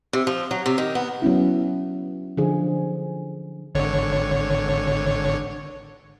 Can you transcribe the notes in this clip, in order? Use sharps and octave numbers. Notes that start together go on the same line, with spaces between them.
C3
F3
F#3
C3
D#3
B3
F#3 B3 C#4 E4
D3 F3 G#4
G#1 D3 C#5